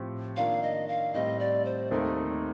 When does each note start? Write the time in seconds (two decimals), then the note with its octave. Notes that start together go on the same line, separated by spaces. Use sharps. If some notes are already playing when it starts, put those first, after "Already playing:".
Already playing: A2 F3 C4 G4
0.36 D#3 A#3 D4 F4 F5
0.62 D#5
0.88 F5
1.14 A2 G3 C4 D#5
1.40 D5
1.65 C5
1.91 D#2 D#3 A3 C4 D#4 A#4